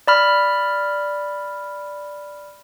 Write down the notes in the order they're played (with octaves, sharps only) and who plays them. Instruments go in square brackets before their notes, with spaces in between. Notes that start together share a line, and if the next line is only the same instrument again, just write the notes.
[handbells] D5 B5 F6